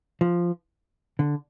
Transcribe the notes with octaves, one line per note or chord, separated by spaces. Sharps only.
F3
D3